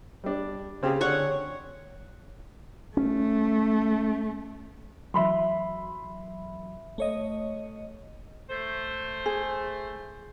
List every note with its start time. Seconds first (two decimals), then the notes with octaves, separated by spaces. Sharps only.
0.24 G3 D4
0.83 C#3 C4 G4 G#4
1.01 D3 C#5 F#5 C#6
2.97 A3 C#4
5.14 E3 F#3 E5 B5 C6
6.98 A3 C#5 D#5
8.50 A3 C5
9.26 G#4